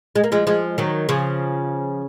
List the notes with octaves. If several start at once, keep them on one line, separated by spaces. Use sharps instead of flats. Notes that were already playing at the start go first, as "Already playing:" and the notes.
G#3
A#3
F3 G#3
F3 G#3
D#3 F#3
C#3 F3